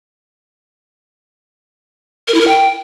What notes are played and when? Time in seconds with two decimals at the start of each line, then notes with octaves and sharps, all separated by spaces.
2.28 A#4
2.34 E4
2.41 A#4
2.48 G5